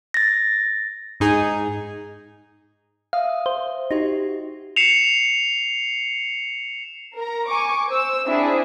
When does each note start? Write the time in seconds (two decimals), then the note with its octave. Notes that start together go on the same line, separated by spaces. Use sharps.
0.14 A6 A#6
1.20 G#2 D#4 G#4
3.13 E5 F5 D#6
3.46 C5
3.91 D#4 F#4 G4 C6
4.76 C7 C#7 E7 F7
7.15 A#4 A#5
7.47 G#5 C#6 D6
7.86 C5 E6
8.26 C4 D4 E4 G#4